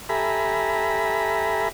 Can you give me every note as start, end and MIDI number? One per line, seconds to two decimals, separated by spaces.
0.09 1.69 67
0.09 1.69 69
0.09 1.69 76
0.09 1.69 80
0.09 1.69 82
0.09 1.69 83